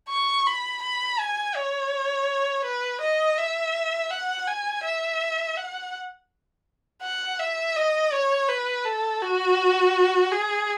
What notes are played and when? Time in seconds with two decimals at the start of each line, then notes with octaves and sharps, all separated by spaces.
0.09 C#6
0.46 B5
0.82 B5
1.19 G#5
1.55 C#5
2.65 B4
3.01 D#5
3.38 E5
4.11 F#5
4.48 G#5
4.84 E5
5.57 F#5
7.03 F#5
7.39 E5
7.76 D#5
8.13 C#5
8.49 B4
8.85 A4
9.21 F#4
10.32 G#4